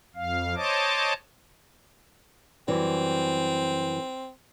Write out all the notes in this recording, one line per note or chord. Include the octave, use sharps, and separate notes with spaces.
F2 F5
C5 C#5 D#5 A5 D6
F#2 E3 G3 C4